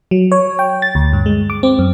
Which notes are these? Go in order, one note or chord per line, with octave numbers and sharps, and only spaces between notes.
F#3
C#5
G5
A6
D2
G2
G#3
D6
C4
F#2